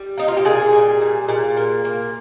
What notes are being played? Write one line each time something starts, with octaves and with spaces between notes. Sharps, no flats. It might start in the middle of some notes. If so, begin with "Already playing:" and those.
Already playing: G3
A#3 D#4
F4
G4
A#2 G#4
G3
A#2
A#2
A#3
A#3